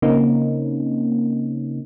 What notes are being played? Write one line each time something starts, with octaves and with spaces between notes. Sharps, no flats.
C#3 A#3 C4 C#4 D#4